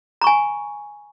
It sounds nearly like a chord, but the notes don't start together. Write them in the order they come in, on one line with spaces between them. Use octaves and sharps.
A#5 C#6 G#5